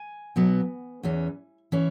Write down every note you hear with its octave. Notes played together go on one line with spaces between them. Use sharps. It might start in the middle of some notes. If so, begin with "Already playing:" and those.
Already playing: G#5
B2 F#3 B3
E2 E3 C#4
E3 C#4